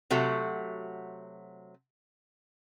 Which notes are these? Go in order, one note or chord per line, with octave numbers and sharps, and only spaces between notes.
C3 F#3 A3 F#4